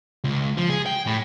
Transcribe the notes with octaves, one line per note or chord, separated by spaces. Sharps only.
C#2
F3
G#4
G5
A2